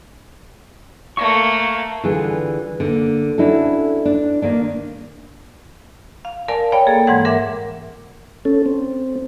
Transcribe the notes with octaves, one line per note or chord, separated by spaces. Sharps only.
A3 A#3 C#6
D3 E3 G3 F4 G#4
D3 A#3
C#4 D4 E4 F#4 A4
D4
D#3 A#3 D4
F5
A#4 D5 F5 G#5 A5
C#5 D5 F5 G5 B5
A#3 G#4 A4
G#2 E3 G#3 F#5 G#6
A#4 E5 F#5 D6
C#4 A4
C4